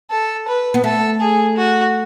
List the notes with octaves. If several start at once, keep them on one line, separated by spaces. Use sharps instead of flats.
A4
B4
B3
A3 A4
G#4
F#4